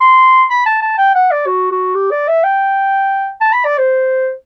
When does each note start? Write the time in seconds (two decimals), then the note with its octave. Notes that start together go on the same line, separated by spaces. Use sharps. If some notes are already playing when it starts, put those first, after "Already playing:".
0.01 C6
0.50 B5
0.66 A5
0.82 A5
0.98 G5
1.15 F#5
1.31 D5
1.46 F#4
1.71 F#4
1.95 G4
2.11 D5
2.28 E5
2.44 G5
3.40 A5
3.52 B5
3.65 D5
3.78 C5